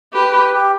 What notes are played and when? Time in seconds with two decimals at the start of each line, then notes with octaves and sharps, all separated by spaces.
0.13 G4 B4
0.33 B4
0.53 G4